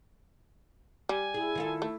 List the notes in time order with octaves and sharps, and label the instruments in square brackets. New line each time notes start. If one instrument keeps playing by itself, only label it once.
[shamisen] G3 [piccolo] G#5
[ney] E4 [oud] G#4
[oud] D#3 F4 A4
[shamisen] A3